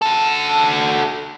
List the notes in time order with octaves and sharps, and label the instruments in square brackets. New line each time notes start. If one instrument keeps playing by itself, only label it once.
[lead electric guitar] F#4 A4